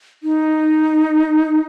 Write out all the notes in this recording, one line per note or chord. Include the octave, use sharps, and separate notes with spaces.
D#4